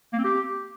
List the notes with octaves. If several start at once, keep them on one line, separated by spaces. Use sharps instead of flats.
A#3
C4
G4